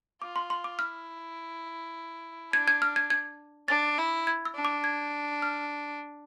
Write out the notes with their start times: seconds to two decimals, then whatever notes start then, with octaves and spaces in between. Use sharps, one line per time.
0.22 F4 D6
0.36 C6
0.50 C6
0.64 D6
0.79 E4 F6
2.53 D4 G#6
2.68 G#6
2.82 F6
2.96 G#6
3.10 G#6
3.68 D4 A6
3.98 E4
4.27 G#6
4.45 E6
4.55 D4
4.65 D6
4.84 G#6
5.42 F6